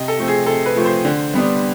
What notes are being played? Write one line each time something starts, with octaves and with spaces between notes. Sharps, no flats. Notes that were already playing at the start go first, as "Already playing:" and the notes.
Already playing: C3 D#5
A4
F3 A3 C4
G#4
C3 A4
B4
F3 A3 C4
C5
D3
G3 B3 D4